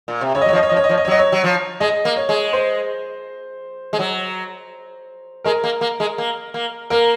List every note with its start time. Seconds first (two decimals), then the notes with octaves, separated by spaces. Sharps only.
0.08 A#2
0.21 C3
0.35 C#3 C#5
0.42 D#5
0.46 F#3
0.49 C#5
0.53 F3
0.56 D#5
0.63 C#5
0.69 F3 D#5
0.77 C#5
0.84 D#5
0.89 F3 C#5
0.98 D#5
1.05 C#5
1.08 F#3 D#5
1.19 C#5
1.32 F#3
1.44 F3
1.80 G#3 D#5
2.05 A#3
2.16 C#5
2.29 G#3
2.53 C5
3.93 G#3
3.99 F#3
5.44 G#3 A#4
5.64 A#3
5.81 A#3
6.00 G#3
6.18 A#3
6.54 A#3
6.90 A#3 A#4